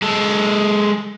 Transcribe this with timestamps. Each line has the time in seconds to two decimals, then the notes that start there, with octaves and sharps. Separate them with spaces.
0.02 G#3 A4